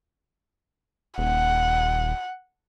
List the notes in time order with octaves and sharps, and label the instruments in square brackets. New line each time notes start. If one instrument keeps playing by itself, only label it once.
[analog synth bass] D#1 [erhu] F#5